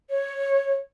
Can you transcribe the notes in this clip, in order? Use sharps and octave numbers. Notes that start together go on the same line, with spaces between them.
C#5